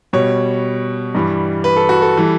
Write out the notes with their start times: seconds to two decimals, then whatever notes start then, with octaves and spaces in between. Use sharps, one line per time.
0.13 B2 G3 C#5
1.15 G2 E3 G3
1.64 B4
1.76 A4
1.89 F#4
2.02 A4
2.17 E3 G3